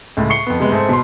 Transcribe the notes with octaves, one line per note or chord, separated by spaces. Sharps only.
C#2 A2
C#6 C7 C#7 G7
F2 B3
C3 G#3 B3
G#2 A3 C4
B2 C6